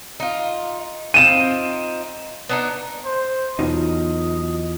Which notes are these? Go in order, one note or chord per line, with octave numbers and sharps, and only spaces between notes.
D#4 F4
C4 D#4 F4 D#7 E7
B3 D4 D#4
C5
B1 E2 B2 D#4 F4 D#5